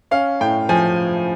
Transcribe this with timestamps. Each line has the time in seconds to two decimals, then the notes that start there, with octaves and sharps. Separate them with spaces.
0.11 C#4 F5
0.41 A2 G5
0.69 F3 G#5